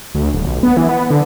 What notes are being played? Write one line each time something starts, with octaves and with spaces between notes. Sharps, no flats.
D2
D#1
B1
B3
E3
B3
D3